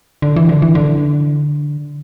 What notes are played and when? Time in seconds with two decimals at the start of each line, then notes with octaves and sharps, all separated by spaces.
0.22 D3
0.36 E3
0.49 D3
0.62 E3
0.75 D3